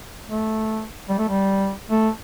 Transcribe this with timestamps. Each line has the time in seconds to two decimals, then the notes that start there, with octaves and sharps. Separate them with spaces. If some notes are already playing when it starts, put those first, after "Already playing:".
0.28 A3
1.09 G3
1.19 A3
1.28 G3
1.90 A3